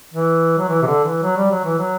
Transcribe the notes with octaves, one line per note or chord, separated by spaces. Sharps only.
E3
F#3
E3
C3
D3
E3
F#3
G3
F#3
E3
F#3